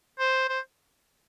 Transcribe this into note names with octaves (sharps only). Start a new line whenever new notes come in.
C5
C5